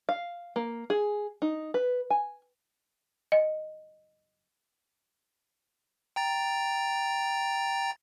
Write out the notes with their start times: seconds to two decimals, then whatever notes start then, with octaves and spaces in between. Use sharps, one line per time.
0.09 F5
0.56 A#3
0.90 G#4
1.42 D#4
1.74 B4
2.10 G#5
3.32 D#5
6.16 G5 A#5 A6